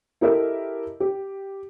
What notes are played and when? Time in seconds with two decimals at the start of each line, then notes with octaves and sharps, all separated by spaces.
0.21 E4 G4 A4 A#4 D#5 E5
1.00 G4